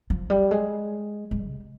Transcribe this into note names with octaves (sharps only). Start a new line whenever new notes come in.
F3
G3
G#3
G#3
C3